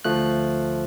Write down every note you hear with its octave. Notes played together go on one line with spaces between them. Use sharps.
D2 F3 A3 F#6